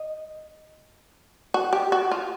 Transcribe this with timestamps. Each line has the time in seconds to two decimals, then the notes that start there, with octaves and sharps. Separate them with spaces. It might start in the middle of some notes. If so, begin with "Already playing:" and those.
Already playing: D#5
1.54 F#4
1.73 G4
1.92 F#4
2.11 F4